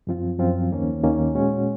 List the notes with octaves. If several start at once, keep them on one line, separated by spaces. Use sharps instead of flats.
F#2 F3 C4 F4
F#2 F3 C4 F4
D#2 D#3 A#3 C#4
D#2 D#3 A#3 C#4
A#2 G#3 C#4 F#4